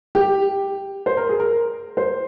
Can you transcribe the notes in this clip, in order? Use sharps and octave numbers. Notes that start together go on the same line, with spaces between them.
G4
C5
A#4
G#4
A#4
C5